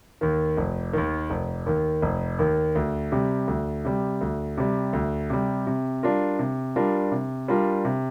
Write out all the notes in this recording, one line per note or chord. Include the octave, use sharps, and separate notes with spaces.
D#2 D#3
F1
D#2 D#3
F1
D#2 D#3
F1
D#2 D#3
D2
C3 G3
D2
C3 G3
D2
C3 G3
D2
C3 G3
C3
G3 D4 F4 A#4
C3
G3 D4 F4 A#4
C3
G3 D4 F4 A#4
C3